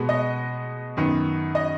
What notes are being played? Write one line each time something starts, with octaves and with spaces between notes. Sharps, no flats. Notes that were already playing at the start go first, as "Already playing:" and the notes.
Already playing: B2 G#3 B3
D#5
F#2 D#3 B3
D#5